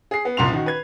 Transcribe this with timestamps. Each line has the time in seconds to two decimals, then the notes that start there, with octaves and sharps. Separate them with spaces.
0.11 G#4 C7
0.25 B3
0.37 F#1 C2 A#2 C6 F7
0.53 D#3 F#4
0.66 B4 G#6